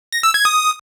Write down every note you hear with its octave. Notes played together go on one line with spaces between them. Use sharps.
A#6
E6
G#6
D#6